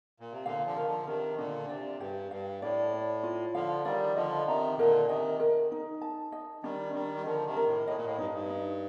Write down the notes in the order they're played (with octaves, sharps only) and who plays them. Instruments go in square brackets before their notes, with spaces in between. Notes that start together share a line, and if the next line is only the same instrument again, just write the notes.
[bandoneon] A#2
C3
[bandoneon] A#2 D3 [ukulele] F5
[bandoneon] D3 F3
[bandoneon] D#3 [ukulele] A#4
[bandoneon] D3 F3
[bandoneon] C3 D#3 [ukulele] A#4
[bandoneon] A#2 D3 [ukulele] D4
[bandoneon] C3 [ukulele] D5
[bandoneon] G2 [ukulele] G4
[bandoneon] G2 [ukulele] F5
[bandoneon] A2 [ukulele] D5
[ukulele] D5
F4
[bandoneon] D3 F3 [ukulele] F5
[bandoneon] D#3 G3 [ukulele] D5
[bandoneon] D3 F3 [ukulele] D#5
[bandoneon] C3 D#3 [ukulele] A#5
[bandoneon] A#2 D3 [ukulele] A#4
[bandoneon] C3 D#3 [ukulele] D#5
[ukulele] A#4
D#4
A5
D#5
[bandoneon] D#3 G3 [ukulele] D4
[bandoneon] D#3 G3 [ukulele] D4
[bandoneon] G3
[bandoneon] D3 F3 [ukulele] A#4
[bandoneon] C3 D#3
[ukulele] A#4
[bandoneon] A2
[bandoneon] A2 [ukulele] D#5
[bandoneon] A#2
A2
[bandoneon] G2 [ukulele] D#4
[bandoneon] G2
[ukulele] D#4